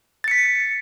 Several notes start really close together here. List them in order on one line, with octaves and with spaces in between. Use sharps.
A6 C#7 B6